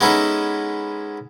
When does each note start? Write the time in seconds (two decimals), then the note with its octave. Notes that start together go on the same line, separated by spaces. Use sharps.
0.01 G#3 B3 C#4 D#4 E4 A4